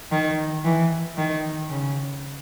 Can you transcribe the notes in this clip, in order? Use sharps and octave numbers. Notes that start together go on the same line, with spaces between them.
D#3
E3
D#3
C#3